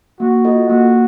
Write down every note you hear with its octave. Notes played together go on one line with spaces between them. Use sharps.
A#3 F#4
F4 A4 D#5
A#3 F#4